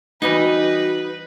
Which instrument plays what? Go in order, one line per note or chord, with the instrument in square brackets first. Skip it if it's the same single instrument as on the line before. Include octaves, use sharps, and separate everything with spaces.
[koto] E3 G3 B3 [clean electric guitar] D#4 [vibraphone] F#4 [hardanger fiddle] B4